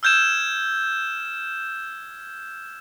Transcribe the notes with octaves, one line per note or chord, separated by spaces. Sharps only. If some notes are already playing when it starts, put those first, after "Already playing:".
E6 F6 G6 G#6 E7